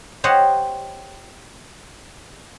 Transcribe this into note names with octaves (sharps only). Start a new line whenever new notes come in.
G4 C5 C#5 D#5 E5 F#5